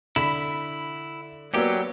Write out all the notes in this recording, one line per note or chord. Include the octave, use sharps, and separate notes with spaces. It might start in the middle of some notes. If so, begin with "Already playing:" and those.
D3 E4 B5 B6
F#3 A#3 B3 C#4 G4 B4 D5 E6